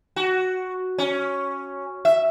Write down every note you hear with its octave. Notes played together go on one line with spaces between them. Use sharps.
F#4
C#4
E5